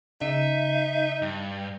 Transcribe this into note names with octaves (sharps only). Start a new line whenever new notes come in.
C#3 D#4 E5
G2